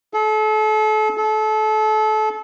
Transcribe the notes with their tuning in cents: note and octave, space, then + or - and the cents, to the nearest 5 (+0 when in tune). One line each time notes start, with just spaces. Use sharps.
A4 -35
A4 -30